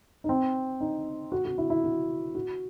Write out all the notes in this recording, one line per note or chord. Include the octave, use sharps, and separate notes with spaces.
D#4
C4
D#4
F#4
F#4
E4
E4
F#4
F#4